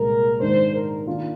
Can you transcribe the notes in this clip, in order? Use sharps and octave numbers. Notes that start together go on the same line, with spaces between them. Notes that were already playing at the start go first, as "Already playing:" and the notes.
Already playing: C2 A#2 G#3 A#4
G#2 D#3 G#3 D4 C5
A#4
D#3 A#3 D4 F4